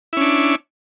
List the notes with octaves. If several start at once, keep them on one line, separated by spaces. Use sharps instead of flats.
C#4 D4 E4